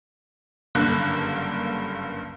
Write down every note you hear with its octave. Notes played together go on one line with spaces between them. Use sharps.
F#1 G2 D3 A#3 F#6